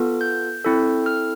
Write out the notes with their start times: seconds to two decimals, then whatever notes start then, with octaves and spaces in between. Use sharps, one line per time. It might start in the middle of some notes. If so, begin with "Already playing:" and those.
Already playing: B3 F4 A4
0.21 G6
0.65 C4 E4 A4
1.06 F6